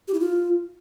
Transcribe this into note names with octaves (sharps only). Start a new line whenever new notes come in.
G4
E4
F4